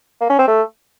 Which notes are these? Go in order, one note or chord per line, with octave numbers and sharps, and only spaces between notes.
A#3
C#4
C4
A3